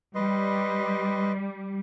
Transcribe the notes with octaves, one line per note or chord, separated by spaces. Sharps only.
G3 B4 D#5 C6